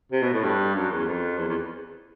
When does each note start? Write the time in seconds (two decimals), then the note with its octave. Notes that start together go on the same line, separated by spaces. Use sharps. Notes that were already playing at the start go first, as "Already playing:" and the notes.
0.12 C3
0.22 B2
0.33 A2
0.44 G2
0.75 F#2
0.91 E2
1.07 F2
1.38 E2
1.49 E2